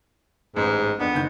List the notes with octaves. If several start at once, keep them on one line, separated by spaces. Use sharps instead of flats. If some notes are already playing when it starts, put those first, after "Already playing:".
A1 G#2
F2 B3 D4
F#1 D#3 G6